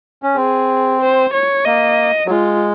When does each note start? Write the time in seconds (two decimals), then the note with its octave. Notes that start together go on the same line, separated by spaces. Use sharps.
0.23 C#4
0.36 C4 G#4
1.01 C5
1.33 C#5
1.65 A#3 D#5
2.26 F#3
2.30 G#3 F4